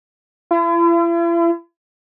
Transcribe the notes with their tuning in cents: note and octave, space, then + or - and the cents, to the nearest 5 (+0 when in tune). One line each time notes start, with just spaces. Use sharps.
E4 +45